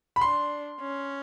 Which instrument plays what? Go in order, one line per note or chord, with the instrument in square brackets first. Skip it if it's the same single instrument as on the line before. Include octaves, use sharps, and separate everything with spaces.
[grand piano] B5
[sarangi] D4 [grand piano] C6
[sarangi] C#4